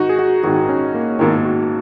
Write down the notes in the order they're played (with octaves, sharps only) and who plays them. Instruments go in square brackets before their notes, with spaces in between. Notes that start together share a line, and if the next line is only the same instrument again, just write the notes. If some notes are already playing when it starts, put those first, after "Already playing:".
Already playing: [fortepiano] G#1 G#2 D#3 [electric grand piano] D#4 F#4
[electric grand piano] G#4
F#4
[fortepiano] G#1 G#2 D#3 [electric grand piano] F#4
[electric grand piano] C#4
A#3
[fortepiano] G#1 G#2 D#3 [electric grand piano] A#3
[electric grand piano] F#4